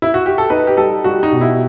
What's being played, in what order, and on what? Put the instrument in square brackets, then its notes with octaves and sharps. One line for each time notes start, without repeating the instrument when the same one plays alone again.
[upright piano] E4
F#4
G4
A4
[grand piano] D#4 [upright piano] B4
[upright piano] G4
[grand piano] G3 [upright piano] A4
[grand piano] G3 [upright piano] F#4
[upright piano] D#4
[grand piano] B2
[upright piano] E4